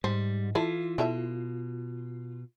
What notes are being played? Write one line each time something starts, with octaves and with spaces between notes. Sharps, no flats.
G#2 G3 C5
E3 E4 F4 A4 B5
B2 E4 A4 E5